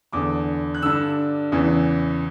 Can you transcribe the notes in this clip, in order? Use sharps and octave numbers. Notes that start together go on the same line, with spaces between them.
E2 D3 D6
F#6
G2 D3 E6
E2 C#3 E3